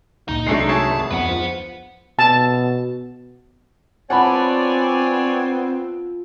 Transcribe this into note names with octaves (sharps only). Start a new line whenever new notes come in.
C#2 A#2 D#4
C2 F#3 G#3 A3 D4 C7
G#4 C#5 E5 A5
G#1
D1 F2 B3 B4 F#5
F3
B2 A5
F3 B3 C4 C#5 D5 F#5 G#5 B5